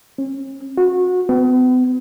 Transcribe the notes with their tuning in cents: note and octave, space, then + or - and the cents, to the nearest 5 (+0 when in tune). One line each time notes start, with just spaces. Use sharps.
C#4 -40
F#4 -30
B3 +40